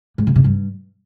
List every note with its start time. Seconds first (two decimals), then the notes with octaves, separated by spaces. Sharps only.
0.18 G#2
0.27 C#3
0.36 C3
0.44 G2